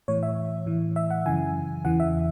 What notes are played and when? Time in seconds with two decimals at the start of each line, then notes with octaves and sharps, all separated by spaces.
0.08 A2 E3 C#5
0.23 E5
0.66 A2 E3
0.96 E5
1.10 F#5
1.26 F#2 C#3 E3 G#5
1.85 E2 C#3 E3 F#5
2.00 E5